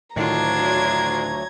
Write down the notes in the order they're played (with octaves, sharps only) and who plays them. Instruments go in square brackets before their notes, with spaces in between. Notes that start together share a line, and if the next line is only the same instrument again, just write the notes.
[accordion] D2 F#3 [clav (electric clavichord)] A2 D#3 [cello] D4 F4 [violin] A#5 G#6